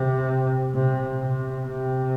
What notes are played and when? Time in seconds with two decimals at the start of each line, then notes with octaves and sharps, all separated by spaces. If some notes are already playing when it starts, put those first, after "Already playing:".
Already playing: C3
0.74 C3
1.20 C3
1.66 C3